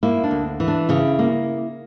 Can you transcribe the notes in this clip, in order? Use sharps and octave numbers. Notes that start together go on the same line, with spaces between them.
A#3 E4
D4
D2
E3
D4
C#3 E4
A#3